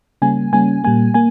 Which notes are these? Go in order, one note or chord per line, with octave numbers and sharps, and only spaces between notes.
C#3 G3 A#3 C#4 G#5
C#3 G3 A#3 C#4 G#5
A#2 G3 A#3 G#5
A#3 G#5